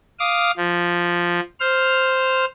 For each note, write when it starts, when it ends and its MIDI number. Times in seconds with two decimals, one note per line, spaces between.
0.19 0.51 77
0.19 0.51 86
0.19 0.51 87
0.57 1.40 53
1.60 2.45 72
1.60 2.45 89